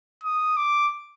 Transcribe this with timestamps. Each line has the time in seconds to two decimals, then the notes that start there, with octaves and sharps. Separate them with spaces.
0.24 D#6
0.57 D6